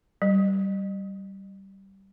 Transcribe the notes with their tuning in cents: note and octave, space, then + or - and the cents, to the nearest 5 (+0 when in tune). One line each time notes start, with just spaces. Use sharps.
G3 -15